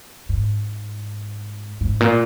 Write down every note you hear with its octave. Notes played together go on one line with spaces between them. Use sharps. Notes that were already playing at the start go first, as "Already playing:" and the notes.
G#2
G#2
A#2